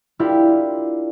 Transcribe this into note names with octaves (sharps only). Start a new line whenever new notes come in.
D4 E4 F4 G4 A#4